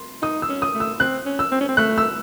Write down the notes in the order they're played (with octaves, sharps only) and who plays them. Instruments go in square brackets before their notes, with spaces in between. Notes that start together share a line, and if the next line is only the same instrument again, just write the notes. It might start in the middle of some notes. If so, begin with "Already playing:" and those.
Already playing: [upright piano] C6
[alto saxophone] D#4 [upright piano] D#6
[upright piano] E6
[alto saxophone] C#4
[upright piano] D#6
[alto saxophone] A3
[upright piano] E6
[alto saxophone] C4 [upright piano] F#6
[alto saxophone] C#4
[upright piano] E6
[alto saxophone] C4
C#4
C4
[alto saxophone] A3 [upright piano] F#6
[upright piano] E6